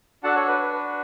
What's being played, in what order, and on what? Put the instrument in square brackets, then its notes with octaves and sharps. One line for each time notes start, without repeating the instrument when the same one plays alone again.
[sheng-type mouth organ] D4 F#4 A4 F#5 A5
A4 C#5
B4
B4
B4